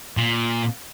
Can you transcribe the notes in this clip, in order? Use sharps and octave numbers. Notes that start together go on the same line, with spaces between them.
A#2